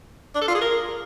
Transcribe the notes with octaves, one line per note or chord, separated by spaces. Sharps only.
D4
A4
F4
G#4
A#4